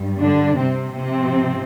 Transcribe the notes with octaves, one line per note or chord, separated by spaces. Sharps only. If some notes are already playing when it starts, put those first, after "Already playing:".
Already playing: G2 G3
D3 D4
C3 C4
G#2 C3 F3 C4